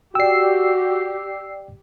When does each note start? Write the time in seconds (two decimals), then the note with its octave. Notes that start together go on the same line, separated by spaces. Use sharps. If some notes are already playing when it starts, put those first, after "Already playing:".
0.15 F#4 G4 D5 G5 E6 C7